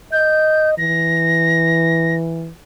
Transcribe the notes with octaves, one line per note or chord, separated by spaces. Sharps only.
D#5 G6
E3 A#6